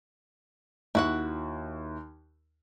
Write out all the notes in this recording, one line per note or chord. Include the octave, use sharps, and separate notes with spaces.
D#2 E4 F#4 F#5